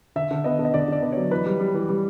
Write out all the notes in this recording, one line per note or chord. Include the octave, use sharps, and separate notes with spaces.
D3 E5
D3
B3 D#5
D3
D#5
D3 D5
D3 D5
B3
F#3 C#5
E3 B4
G3
G3
E3
G3